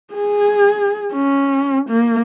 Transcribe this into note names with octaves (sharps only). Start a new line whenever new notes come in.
G#4
C#4
A#3